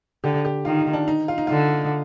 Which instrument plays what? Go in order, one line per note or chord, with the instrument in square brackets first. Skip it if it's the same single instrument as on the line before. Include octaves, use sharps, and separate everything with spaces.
[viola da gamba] D3 [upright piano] G4
[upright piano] G4
[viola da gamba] D#3 [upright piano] F4
[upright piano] D#4
D4
D#4
F4
D#4
[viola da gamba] D3 [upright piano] F4